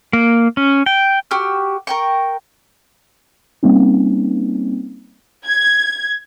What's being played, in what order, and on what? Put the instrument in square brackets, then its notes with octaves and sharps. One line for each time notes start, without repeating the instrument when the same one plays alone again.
[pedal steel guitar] A#3
C#4
G5
[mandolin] F#4 G4 E6 F6
A#4 G5 C#6
[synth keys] G3 A#3 C4 C#4 D#4
[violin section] G#6